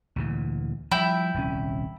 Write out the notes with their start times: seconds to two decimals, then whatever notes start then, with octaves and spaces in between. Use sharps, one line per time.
0.16 D2 A#2 E3
0.91 F3 G3 E4 G5
1.34 D#1 C2 C#4